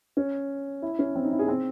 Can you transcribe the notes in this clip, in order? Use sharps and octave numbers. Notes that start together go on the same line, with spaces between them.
C#4
E4
C#4
C4
D#4
E4
G#4
C4